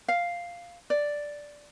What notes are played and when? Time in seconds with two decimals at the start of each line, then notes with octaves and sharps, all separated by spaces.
0.08 F5
0.90 D5